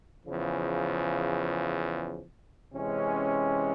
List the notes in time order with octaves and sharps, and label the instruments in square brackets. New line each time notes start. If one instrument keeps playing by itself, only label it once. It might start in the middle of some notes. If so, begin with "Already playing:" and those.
[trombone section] E2 C#3 F3
C3 E3 G#3 C#4